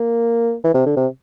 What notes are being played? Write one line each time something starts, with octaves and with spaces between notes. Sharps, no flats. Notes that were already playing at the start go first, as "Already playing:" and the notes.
Already playing: A#3
E3
C3
D3
C3